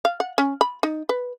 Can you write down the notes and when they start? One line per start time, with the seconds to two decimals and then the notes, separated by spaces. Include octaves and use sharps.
0.05 F5
0.20 F#5
0.38 C#4
0.61 B5
0.83 D#4
1.09 B4